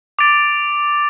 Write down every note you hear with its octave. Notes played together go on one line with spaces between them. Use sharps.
D6 A6 D7